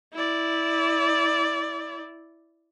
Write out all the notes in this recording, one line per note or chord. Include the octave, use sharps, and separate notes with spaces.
E4 D5